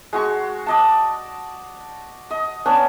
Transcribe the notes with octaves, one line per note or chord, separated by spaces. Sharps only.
G#3 F#4 C#6
D5 D#5 A5
D#5
B3 C#4 D4